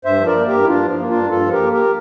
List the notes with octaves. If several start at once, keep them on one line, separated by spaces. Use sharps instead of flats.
G2 C5 E5
F3
A#4 D5
A#3
G4 A#4
G2
E4
G2 D4 F4
F3
A#3
D4 F4
G2
G2 F4 A4
F3
G4 A#4
A#3
G4 A#4